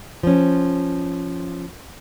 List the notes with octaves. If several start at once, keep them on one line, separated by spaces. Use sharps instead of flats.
F3 C#4